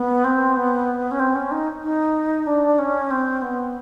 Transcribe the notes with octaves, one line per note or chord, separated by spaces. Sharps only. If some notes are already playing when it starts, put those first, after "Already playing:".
Already playing: B3
C4
B3
C#4
C4
C#4
D#4
D#4
D4
C#4
C4
B3